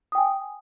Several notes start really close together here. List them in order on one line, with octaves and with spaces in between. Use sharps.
D#6 G5 G#5